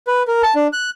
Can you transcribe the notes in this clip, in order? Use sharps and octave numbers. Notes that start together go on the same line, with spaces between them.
B4
A#4
A5
D4
F#6